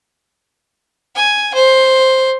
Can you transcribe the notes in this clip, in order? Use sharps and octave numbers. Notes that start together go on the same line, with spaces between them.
G#5
C5